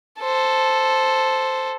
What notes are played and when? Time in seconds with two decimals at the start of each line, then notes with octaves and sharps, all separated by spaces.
0.20 A4 C5